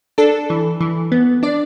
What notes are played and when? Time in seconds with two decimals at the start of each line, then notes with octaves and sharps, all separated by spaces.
0.18 D4 A4
0.50 E3
0.80 E3
1.12 B3
1.43 D4 D5